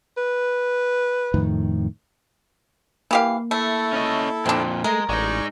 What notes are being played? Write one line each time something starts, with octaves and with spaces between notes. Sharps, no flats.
B4
F2 A2 D#3
E3 A#3 G4 F5
A3 E4 A4
C#4 D#5
F2 A#2 C4 D4
G#3 A3 A#4
A1 G#3 D#4 D5 C#6